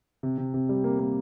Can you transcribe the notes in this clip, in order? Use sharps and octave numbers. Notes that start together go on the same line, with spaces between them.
C3
C3
C3
G3
A#3
A#3